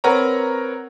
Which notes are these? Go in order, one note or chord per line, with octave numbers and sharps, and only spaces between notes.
C4 A#4 B4 C#5 F#5 A#5